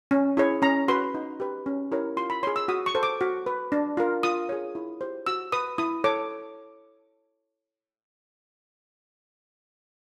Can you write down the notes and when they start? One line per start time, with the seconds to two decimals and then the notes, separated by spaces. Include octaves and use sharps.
0.11 C#4
0.37 E4 G#4 C#5
0.62 C#4 A#5
0.88 F#4 B4 C6
1.14 D#4
1.40 G4 B4
1.66 C#4
1.92 E4 G4 A#4 C#5
2.17 F4 C6
2.30 B5
2.43 C#5 C6
2.47 G#4
2.56 E6
2.68 F#4 D#6
2.86 C#6
2.95 A4 C5
3.03 D6
3.21 F#4
3.46 B4
3.72 D4
3.97 F4 A#4
4.23 F4 D#6
4.49 G#4 C#5
4.75 E4
5.01 G4 C5
5.26 F#4 E6
5.52 B4 D#6
5.78 E4 D#6
6.04 A4 C#5 D6